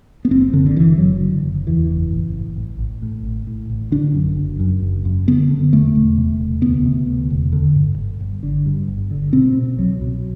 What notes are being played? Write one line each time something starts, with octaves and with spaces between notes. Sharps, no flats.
B3
F#1 C4
F#1 D3
D3
F#1 E3
F#1 F#3
D3
F#1
E2 E3
F#1
A1
A1
A1
A1
A2
A1
A2
A1
D3 D4
F#2
F#1
F#2
F#1
F#2
D3 B3
D3
E1 A3
E1
C3
E1
D2 B3
C3
D2
E1
D3
G2
G1
G1
D3
G2
G1
D3
B2 C4
B2
C2 F#3
B2